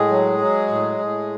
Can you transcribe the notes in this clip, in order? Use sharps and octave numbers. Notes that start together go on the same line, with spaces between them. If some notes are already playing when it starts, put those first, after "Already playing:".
Already playing: A2 G#3 G#4
F#3
F#3
A2
A2